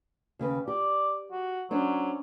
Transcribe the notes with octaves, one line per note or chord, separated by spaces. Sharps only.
D#2 C#3 B4
G4 D5
F#4
F#3 C#4 D4 C5